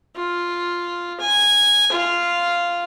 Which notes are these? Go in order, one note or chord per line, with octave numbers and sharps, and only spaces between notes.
F4
G#5
F4 F5